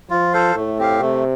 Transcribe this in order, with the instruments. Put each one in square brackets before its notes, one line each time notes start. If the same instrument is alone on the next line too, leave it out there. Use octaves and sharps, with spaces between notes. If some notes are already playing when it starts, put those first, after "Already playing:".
[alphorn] F3 [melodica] F4
[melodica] A4 C5 F5
[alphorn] A2 [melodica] A3
[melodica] C4 G4 F5
[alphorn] C3 [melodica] A3